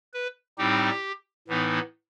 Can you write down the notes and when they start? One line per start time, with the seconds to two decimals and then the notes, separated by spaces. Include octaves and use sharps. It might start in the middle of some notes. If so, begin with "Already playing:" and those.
0.14 B4
0.58 A2 G3 C4 D#4 G4
1.48 A2 E3 B3 D#4